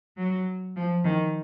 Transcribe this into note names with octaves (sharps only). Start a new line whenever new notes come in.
F#3
F3
D#3